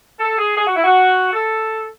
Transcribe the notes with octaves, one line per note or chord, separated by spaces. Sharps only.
A4
G#4
G#4
F#4
E4
F#4
A4